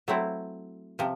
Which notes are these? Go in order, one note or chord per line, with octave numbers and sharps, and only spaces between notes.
F#3 A3 C4 E4
C3 F3